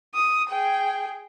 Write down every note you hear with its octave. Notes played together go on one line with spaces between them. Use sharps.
D#6
G#4 G5